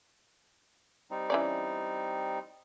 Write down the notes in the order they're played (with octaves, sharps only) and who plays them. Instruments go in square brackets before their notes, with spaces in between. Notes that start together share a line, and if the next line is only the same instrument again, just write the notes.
[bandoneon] G3 C4 D#4
[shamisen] E3 C#4 D5